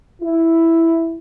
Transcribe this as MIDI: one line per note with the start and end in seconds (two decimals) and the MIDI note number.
0.22 1.17 64